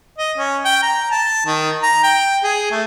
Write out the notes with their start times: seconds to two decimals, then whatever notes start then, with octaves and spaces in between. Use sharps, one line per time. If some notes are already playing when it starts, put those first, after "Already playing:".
0.18 D#5
0.37 C#4
0.65 G5
0.82 A#5
1.11 A5
1.46 D#3
1.83 A#5
2.03 G5
2.43 G#4
2.71 A3